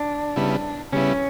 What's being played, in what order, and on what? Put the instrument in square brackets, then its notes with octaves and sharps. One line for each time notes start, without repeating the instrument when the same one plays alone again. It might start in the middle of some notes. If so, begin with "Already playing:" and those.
Already playing: [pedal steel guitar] D4
[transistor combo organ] C#3 G3 B3 E4
[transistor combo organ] C#3 G3 B3 E4 [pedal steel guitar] C#4